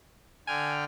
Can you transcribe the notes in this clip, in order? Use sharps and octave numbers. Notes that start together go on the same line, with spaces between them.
D3 G5 G#5 F6